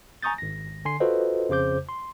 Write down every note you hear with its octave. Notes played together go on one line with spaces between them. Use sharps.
G#5 A#5 C#6 D#6 G6 A6
G#1 A#6
D3 G#5 C6 C7
F4 F#4 A4 B4 C5 D#5
F2 C#3 C5 D6 G6
C6